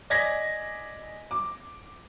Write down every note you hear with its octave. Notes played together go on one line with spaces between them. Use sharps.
D5 D#5 G#5 G#6 A#6 B6
D6